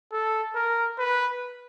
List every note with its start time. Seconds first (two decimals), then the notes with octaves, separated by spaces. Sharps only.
0.12 A4
0.55 A#4
0.98 B4